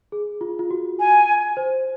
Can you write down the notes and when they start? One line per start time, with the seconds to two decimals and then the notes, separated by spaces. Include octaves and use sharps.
0.12 G#4
0.41 F4
0.59 F4
0.71 F#4
1.00 G#5
1.57 C5